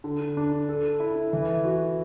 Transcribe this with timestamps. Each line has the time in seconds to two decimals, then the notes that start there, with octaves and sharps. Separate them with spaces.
0.04 D3
0.37 D4
0.69 A4
1.00 E4
1.33 E3
1.65 F#4